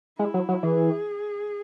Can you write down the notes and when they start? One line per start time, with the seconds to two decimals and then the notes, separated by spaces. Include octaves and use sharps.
0.19 G#3 E4
0.34 F#3
0.49 F#3
0.63 E3 G#4